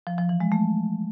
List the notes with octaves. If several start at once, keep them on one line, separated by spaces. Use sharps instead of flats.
F3
F3
E3
G#3
A3